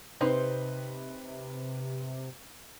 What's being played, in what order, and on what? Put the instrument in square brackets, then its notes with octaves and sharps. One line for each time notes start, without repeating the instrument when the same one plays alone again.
[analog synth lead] C3 [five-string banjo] C4 D#4 C5 [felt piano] B4